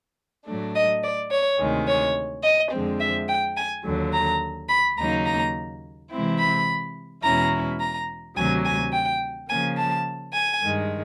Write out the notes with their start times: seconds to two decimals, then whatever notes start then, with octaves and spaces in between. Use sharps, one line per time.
0.46 A2 F#3 A3 D4
0.75 D#5
1.03 D5
1.31 C#5
1.59 D2 C3 D#3 G#3
1.87 C#5
2.43 D#5
2.72 F2 D3 F3 G#3 C4
3.00 E5
3.28 G5
3.56 G#5
3.84 D#2 D3 F#3
4.13 A#5
4.69 B5
4.97 D#2 C#3 F#3 A#3 D#4 A#5
5.25 A#5
6.11 C3 E3 G#3 C4 E4
6.39 B5
7.23 E2 B2 G#3 C#4 E4 A#5
7.80 A#5
8.36 D2 C3 D#3 F#3 G#5
8.64 G#5
8.92 G5
9.49 C#3 F3 A#3 G#5
9.77 A5
10.33 G#5
10.62 G2 D#3 G#3